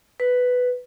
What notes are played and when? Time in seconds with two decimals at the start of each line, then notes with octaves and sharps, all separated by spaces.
0.20 B4